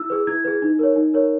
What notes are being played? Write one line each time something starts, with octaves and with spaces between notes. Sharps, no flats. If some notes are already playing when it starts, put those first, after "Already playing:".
Already playing: E4 E6
G#4 B4
E4 G#6
G#4 B4
D#4
A#4 C#5
D#4
A#4 C#5